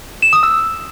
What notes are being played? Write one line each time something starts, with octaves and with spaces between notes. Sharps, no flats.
E7
D#6
E6